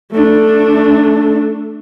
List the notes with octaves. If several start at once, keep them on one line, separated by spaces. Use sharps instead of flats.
A3 D4